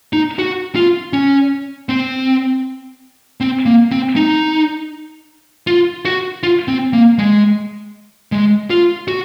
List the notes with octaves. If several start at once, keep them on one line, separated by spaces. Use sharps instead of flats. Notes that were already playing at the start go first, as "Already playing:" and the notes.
D#4
F#4
F4
C#4
C4
C4
A#3
C4
D#4
F4
F#4
F4
C4
A#3
G#3
G#3
F4
F#4